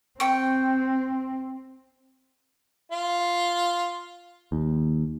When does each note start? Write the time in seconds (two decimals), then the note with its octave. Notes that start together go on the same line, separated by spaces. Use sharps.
0.20 C4 G5 C#6
2.92 F4
4.52 D#2